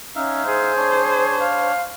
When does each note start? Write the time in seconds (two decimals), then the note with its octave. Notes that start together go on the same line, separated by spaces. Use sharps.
0.15 C#4 D#4 E5 F5
0.46 G#4 C5
0.77 D4 C#5
1.39 F5